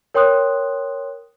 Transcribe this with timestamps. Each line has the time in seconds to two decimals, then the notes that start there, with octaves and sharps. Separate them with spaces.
0.14 A#4 C#5 G5 C6 D#6 F#6